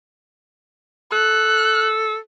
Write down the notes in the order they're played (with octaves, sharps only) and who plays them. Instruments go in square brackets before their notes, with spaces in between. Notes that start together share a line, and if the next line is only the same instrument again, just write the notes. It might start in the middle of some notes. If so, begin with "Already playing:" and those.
[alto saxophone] A4 [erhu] F#6